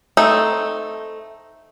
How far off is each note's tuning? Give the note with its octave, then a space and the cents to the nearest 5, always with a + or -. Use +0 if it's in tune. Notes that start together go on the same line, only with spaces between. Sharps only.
A3 +0 C4 +0 D#4 +0